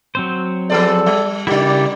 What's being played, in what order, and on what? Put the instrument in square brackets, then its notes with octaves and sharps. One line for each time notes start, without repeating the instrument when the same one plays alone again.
[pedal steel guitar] F#3 C4 C5
[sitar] F3 B3 D5 [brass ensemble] G#4 A4
[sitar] G3
[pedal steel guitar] C#3 E4 [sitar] G3 D4 [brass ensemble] G4 A#4 D5